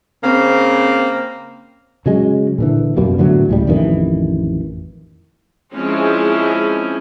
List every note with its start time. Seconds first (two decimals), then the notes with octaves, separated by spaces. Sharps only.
0.24 C#3 A#3 C4
2.06 C#3 F#3 G#3
2.58 A#2 D3 E3
2.97 F#2 B2 G3 A#3
3.18 A2 D3 E3 F#3
3.49 C#2 A2 G3
3.67 A1 F2 D#3 E3
5.75 F3 G#3 C4 C#4 E4